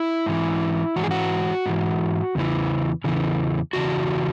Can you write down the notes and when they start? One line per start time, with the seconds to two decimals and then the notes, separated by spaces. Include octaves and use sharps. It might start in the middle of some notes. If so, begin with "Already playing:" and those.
Already playing: E4
0.26 G#2 E3
0.96 G#2 E3 F#4
1.03 G#4
1.11 F#4
1.66 G#2 E3
2.35 E2 C#3 E3
3.04 E2 C#3 E3
3.73 E2 C#3 E3 F#4